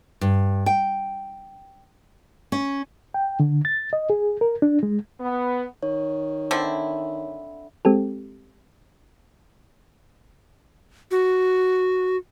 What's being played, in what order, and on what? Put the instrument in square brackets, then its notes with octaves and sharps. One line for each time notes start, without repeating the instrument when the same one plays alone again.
[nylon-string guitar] G2
G5
C#4
[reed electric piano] G5
D3
A6
D#5
G#4
A#4
D4
G#3
[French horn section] B3
[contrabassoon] D#3 [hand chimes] C#5
[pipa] D3 C4 E4
[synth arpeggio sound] G#3 C4 G4 A4
[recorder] F#4